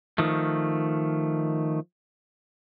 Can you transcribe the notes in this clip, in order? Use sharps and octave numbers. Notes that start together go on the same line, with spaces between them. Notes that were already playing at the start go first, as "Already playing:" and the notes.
D#3 F3 A3